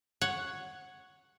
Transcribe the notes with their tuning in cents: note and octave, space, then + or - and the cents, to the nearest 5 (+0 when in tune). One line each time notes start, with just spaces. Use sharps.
C#5 +0 F#5 +0